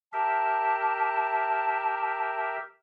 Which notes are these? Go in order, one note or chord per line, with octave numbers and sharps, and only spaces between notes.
G4 A#4 E5 A5